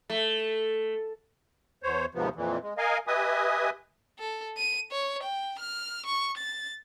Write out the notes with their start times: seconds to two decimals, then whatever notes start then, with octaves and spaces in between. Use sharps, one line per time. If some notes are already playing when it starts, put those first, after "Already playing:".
0.10 A3
1.83 E2 C5 C#5
2.15 D#2 G#2 C3 F3 B3
2.36 F2 A#2 E3
2.63 G#3
2.78 A#4 D#5 F5 G#5
3.07 G4 B4 D#5 E5 G#5 D#6
4.19 A4
4.57 D#7
4.91 C#5
5.23 G5
5.59 F6
6.06 C#6
6.37 A6